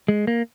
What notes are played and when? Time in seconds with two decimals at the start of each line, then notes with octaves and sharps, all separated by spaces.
0.08 G#3
0.27 A#3